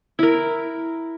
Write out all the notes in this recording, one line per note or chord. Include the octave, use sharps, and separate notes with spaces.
E4 A#4